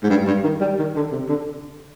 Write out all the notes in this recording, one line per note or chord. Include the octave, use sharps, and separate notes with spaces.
G#2
G2
G2
D#3
G3
D#3
D3
C3
D3